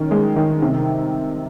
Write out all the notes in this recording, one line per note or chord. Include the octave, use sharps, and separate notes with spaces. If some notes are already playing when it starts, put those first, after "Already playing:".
Already playing: D#3 C#4
G#3
D#3
C3